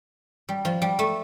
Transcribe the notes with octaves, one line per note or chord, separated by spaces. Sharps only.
G3
F3
G3
A3